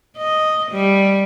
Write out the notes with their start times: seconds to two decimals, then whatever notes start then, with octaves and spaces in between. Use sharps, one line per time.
0.17 D#5
0.71 G3